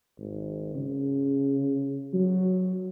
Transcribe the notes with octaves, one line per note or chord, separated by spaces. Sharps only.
G#1
C#3
F#3